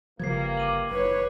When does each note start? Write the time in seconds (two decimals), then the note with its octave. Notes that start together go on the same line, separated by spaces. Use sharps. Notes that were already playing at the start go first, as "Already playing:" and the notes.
0.19 G1 C#3 E3 F3 G3 A#3 G#6 C7
0.57 D6 D#7 F#7
0.91 F#1 B4 C#5